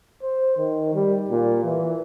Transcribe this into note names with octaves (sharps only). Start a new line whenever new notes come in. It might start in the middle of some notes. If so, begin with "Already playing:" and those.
C5
D#3
G3
A#2
E3